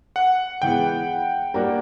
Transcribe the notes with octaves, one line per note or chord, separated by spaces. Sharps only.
F#5
E3 G#3 B3 G5
G3 A#3 D4 F#4 A#4